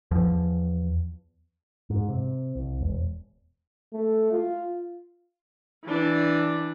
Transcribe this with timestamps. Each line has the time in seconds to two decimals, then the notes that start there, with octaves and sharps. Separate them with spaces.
0.11 E2 F3
1.90 G#2
2.09 C3
2.55 C2
2.81 E1
3.93 A3
4.32 F4
5.85 E3 D4